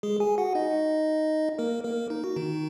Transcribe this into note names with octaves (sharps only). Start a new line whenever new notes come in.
G#3 G#4
G#4 G#5
F#4 F#5
D#4 D#5
A#3 A#4
A#3 A#4
D#4
F#4
D#3 D#4